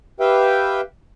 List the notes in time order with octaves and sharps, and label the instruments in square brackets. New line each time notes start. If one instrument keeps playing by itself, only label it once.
[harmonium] G4 B4 E5 F5 G5